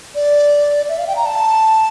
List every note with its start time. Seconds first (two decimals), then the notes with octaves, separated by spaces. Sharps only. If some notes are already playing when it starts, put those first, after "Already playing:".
0.15 D5
0.89 E5
0.99 F5
1.07 G5
1.16 A#5
1.26 A5